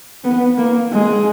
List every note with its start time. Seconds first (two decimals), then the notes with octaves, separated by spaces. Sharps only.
0.24 B3
0.57 A#3
0.92 G#3